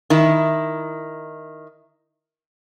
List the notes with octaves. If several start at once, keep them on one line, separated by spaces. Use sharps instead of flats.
D#3 E4